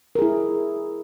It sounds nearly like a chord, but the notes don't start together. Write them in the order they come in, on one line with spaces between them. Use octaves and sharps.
A#4 G#4 E4